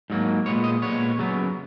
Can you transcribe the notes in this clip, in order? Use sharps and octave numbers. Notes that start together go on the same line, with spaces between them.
G#2 F#3 A#3
A#2 G#3 B3 C#5
D#5
A#2 G#3 B3 C#5
F#2 C#3 F#3 B3